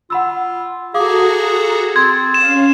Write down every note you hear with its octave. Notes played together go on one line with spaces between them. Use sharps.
F4 F#5 B5 E6
F#4 G#4 A4 F5 A#5 D6 D#6
C4 C6 G#6 A6
C#4 F5 E7